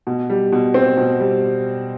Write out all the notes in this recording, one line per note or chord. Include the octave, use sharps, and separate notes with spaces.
B2
G3
B2
C4
B2
G3